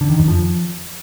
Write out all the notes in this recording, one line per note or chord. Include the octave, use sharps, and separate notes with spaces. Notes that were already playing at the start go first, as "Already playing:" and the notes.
D3
D#3
F2
F3